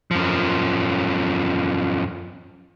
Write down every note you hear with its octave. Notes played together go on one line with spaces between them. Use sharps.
F#2 F3